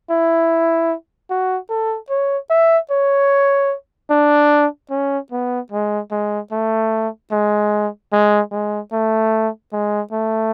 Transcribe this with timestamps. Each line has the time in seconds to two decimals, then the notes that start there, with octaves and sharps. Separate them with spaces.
0.10 E4
1.30 F#4
1.70 A4
2.10 C#5
2.50 E5
2.91 C#5
4.10 D4
4.91 C#4
5.32 B3
5.72 G#3
6.11 G#3
6.52 A3
7.32 G#3
8.13 G#3
8.52 G#3
8.92 A3
9.73 G#3
10.12 A3